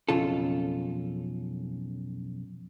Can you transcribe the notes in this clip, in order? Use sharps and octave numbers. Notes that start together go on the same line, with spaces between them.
B1 F2 C#3 F4 A4